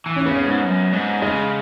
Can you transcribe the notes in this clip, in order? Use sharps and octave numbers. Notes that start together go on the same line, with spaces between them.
E3
C#4
C#3 B3
C#4
G#2
F#2
G#2
C#3 G#3